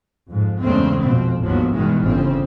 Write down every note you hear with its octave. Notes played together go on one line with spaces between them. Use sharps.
F2 G#2
E2 G2 C#3 G#3 A3 C4
A#1 F2 B2 C4
G1 D#2 G#2 F3 F#3 B3
G2 B2 D#3 E3 G#3
G1 C#3 C4